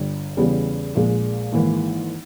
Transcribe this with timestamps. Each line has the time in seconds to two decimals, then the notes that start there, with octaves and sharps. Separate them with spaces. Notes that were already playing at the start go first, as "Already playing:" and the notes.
Already playing: G1 G2 G3
0.37 E2 C#3 G3 B3 G4
0.95 A#1 A#2 G#3
1.53 G#1 G#2 E3 A#3